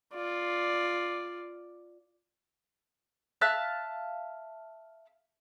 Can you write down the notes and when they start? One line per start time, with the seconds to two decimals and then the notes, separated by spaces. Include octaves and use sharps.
0.14 F4 D5
3.41 E5 F5 A5 F#6